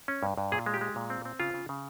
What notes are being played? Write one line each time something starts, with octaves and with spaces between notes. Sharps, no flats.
C#4
G2
G2
A#2 G#4
G#3
G4
G#3
A#2
C4
C4
C#3 F4
C#3
C#3